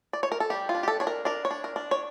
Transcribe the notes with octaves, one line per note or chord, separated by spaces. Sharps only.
D5
C#5
A#4
A4
G3 G4
F4
D4
G4
A4
D4 C#5
A#4
D4 A#4
C#5
D4
A#4
D4
C#5